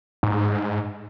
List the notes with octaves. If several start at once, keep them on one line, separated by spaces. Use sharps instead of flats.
G#2